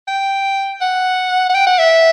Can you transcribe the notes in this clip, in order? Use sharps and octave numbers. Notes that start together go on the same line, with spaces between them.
G5
F#5
F#5
G5
F#5
E5